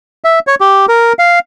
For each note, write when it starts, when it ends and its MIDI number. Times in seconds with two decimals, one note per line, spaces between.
0.24 0.39 76
0.47 0.55 73
0.61 0.86 67
0.89 1.13 70
1.19 1.39 77